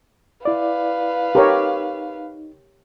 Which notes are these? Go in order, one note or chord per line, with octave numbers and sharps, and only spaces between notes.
E4 B4 D5 F5
D#4 G4 A#4 C#5